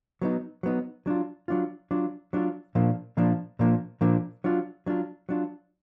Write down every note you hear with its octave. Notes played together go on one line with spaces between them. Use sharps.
F#3 B3 D#4
F#3 B3 D#4
F#3 D4 F4
F#3 D4 F4
F#3 D4 F4
F#3 D4 F4
A#2 F3 A#3 D4
A#2 F3 A#3 D4
A#2 F3 A#3 D4
A#2 F3 A#3 D4
F#3 D4 F4
F#3 D4 F4
F#3 D4 F4